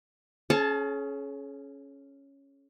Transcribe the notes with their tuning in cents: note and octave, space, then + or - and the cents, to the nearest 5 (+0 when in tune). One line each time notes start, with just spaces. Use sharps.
C#4 +0 G#4 +40 A5 +0